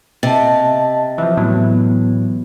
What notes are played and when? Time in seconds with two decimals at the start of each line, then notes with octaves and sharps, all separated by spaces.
0.23 C3 D#5 A5 A6
1.18 E3 F3 E5
1.37 A2 E3 F#3 B3